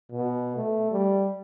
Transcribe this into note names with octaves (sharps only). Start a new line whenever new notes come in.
B2
A3
G3